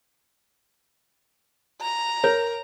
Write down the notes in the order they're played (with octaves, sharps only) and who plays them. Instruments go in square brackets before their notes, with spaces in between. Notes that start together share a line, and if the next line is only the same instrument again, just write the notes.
[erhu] A#5
[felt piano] A#4 [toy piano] C#5